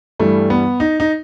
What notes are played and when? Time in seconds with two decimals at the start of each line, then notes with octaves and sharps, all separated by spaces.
0.19 G2 E3 G3 A3
0.50 B3
0.80 D#4
1.00 D#4